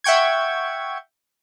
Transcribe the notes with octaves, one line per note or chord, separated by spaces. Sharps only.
E5 F#5 G5 C#6 G#6